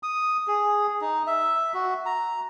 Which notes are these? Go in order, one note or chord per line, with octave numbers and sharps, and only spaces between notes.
D#6
G#4
D#4
E5
F#4
A#5